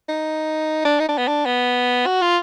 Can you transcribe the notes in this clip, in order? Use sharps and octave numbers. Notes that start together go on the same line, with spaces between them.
D#4
D4
D#4
D4
B3
D4
B3
F#4
F4